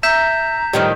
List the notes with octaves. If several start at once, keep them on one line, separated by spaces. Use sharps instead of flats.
E5 A#5 G6 B6 E7
A2 D#3 F3 G3